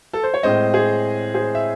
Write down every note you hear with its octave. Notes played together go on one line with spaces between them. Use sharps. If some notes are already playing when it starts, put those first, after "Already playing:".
A4
C5
C#5
A2 G#3 C4 C5 D#5
G#4 C5
G#4 C5
E5